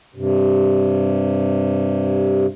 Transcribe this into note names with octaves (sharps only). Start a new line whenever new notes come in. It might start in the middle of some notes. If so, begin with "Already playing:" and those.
G2 C3